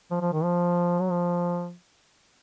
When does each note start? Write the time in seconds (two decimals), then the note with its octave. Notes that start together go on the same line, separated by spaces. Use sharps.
0.11 F3
0.21 F3
0.33 D#3
0.43 F3
1.00 F#3
1.11 F3